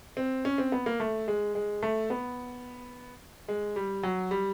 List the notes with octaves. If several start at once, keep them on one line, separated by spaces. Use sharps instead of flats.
C4
C#4
C4
B3
A#3
A3
G#3
G#3
A3
B3
G#3
G3
F#3
G3